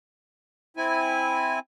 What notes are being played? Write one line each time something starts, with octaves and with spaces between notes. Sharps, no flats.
C4 E4 G#5